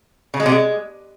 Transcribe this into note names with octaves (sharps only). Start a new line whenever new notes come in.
C#3
G#3
C3
G#3